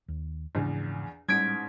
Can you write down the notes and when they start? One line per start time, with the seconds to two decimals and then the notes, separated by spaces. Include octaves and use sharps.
0.08 D#2
0.55 A#1 E2 G#2 C#3
1.29 A1 G#2 G3 G#6 B6 D7